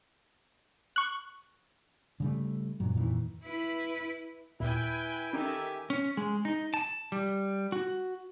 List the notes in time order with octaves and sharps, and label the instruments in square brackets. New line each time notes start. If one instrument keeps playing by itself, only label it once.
[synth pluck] C#6 F#6
[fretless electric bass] C#3 G3 A3
G2 A#2 F#3
F2 A#2 D#3 E3
[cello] E4 B4
[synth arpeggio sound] D#2 A#2 [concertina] E4 [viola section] B4 G5 G#5
[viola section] D#3 A4 E5 [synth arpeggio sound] C#4 D#4 [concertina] G4 G#5
[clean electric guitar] C#4
G#3
D#4
A5
G3
F#4